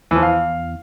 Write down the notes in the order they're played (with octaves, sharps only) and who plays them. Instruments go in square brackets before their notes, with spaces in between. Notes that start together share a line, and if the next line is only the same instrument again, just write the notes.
[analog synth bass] E2 [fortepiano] E3 F3
[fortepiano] F5